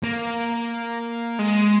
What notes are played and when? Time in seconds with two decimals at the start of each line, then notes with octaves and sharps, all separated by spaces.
0.03 A#3
1.39 G#3